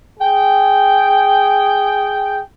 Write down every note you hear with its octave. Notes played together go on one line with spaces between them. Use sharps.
G#4 G5